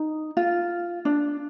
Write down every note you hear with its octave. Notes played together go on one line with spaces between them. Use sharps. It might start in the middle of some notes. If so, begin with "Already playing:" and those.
Already playing: D#4
F4
D4